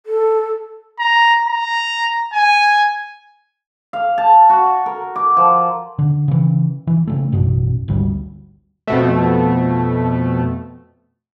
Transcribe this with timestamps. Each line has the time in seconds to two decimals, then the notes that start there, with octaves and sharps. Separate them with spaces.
0.06 A4
0.99 A#5
1.48 A#5
2.33 G#5
3.93 F5
4.18 A5
4.50 F#4
4.86 A#4
5.16 D6
5.37 F3
5.99 D3
6.28 C#3 E3
6.87 E3
7.07 C#3 E3 A3
7.32 A1 F#2 B2
7.88 G#1 D2 G3
8.87 F2 B2 A3